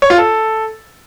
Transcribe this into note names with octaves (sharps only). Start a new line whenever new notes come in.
C#5
F4
A4